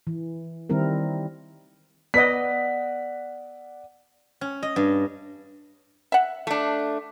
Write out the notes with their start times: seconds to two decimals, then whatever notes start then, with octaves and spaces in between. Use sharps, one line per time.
0.07 E3
0.70 D#3 G3 C4 E4 A#4
2.14 B3 B4 D5 D#5 F#5 B6
4.41 C#4
4.63 D#5
4.76 G2
6.12 E5 F#5
6.47 A3 D4